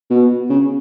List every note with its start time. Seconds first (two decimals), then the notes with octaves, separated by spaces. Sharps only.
0.10 B2
0.49 C#3